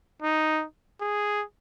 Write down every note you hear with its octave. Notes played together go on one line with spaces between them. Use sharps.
D#4
G#4